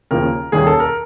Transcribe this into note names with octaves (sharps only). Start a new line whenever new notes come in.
D#2 C#3 F3 A#3 A#4
D#2 D#3 G3 A#3 C#4 G#4
A4
A#4